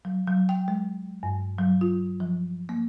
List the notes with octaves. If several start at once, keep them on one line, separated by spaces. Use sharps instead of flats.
F#3
F#3
G5
G#3
G2
F#3
F4
F3
A#3